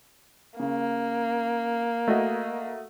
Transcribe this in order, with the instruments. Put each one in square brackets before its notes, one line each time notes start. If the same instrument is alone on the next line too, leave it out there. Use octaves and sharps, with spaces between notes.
[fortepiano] C#3 [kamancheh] A#3
[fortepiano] A3 F#4 D#5